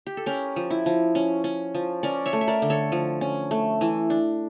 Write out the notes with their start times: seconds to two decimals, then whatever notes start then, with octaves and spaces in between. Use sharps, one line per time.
0.07 G4
0.17 A4
0.26 C#4 G4 A#4
0.56 F3
0.70 E4
0.86 F3
1.15 C#4
1.44 C#4
1.74 F3
2.03 C#4 A#4 D5
2.26 C#5 E5
2.33 A3
2.41 E5
2.48 A#4 D5
2.62 D3
2.70 A4 C#5
2.92 F3
3.21 C#4
3.51 A3
3.81 E3
4.10 D4